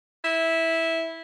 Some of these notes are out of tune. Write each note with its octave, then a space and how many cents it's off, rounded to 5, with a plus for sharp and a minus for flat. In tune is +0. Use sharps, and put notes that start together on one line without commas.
E4 -10